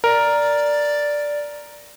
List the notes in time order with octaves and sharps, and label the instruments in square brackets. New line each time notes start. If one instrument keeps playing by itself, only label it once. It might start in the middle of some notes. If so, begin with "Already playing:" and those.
[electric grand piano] A#4 [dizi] D5